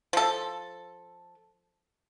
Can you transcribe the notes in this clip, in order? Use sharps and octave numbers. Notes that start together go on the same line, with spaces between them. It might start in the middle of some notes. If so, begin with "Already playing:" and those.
F3 A4